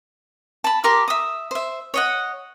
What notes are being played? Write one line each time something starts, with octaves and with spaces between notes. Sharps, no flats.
A5 B5
G4 A#4 C6 D6
E5 D#6
C5 E5
C#5 D#5 F#5